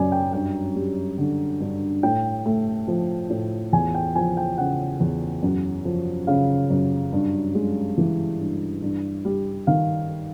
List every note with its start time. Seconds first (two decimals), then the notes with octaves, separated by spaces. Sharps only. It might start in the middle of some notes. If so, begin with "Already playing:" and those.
Already playing: F#2 D5 G#5
0.12 G5
0.33 G2 G5
0.75 G3
1.18 D3
1.61 G2
2.03 A2 G5
2.45 A3
2.88 F3
3.30 A2
3.73 E2 G#5
3.95 G5
4.15 F3 G#5
4.37 G5
4.58 C#3 F#5
5.00 E2
5.43 F#2
5.85 F3
6.27 C#3 F5
6.70 F#2
7.12 G2
7.55 G#3
7.98 E3
8.40 G2
8.82 G2
9.25 G3
9.67 D#3 F5